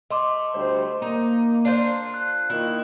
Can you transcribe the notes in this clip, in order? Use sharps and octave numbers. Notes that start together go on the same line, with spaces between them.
A3 D#5 C6 D6
D2 G3 C5
A#3 D#4
D4 F4 C5
F#6
D#3 A#3 E4 F4